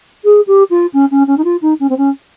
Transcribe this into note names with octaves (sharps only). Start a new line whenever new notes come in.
G#4
G4
F4
C#4
C#4
C#4
D#4
F4
D#4
C#4
C4
C#4